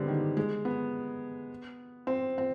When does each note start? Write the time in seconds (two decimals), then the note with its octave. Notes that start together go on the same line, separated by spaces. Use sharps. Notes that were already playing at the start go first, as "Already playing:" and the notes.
Already playing: D3 G3 G#3 B3 C4
0.08 D#3
0.37 G#3
0.65 B3
2.07 C4
2.38 C4